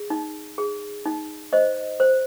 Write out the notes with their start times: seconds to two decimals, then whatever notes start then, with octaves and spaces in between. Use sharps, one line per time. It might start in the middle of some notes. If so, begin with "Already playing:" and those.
Already playing: G#4
0.10 D#4
0.58 G#4
1.06 D#4
1.53 C5 D#5
2.00 C5